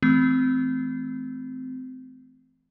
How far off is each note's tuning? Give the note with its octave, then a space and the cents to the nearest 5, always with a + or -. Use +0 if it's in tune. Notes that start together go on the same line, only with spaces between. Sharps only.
E3 +0 A3 -35 C4 -25